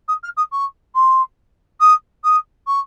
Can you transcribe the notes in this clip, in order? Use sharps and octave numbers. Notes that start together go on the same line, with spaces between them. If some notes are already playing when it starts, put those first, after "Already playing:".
D#6
F6
D#6
C#6
C6
D#6
D#6
C#6